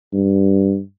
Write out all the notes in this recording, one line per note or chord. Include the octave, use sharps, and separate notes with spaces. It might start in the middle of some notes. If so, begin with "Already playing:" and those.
G2